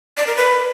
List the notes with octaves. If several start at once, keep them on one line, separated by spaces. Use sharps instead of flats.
D5
A#4
B4